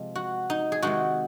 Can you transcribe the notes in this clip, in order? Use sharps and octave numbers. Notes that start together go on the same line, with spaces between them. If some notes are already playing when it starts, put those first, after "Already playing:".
Already playing: C3 F3 G#3 C4
F#4
D#4
G#4
C3 D#3 G#3 D#4 F#4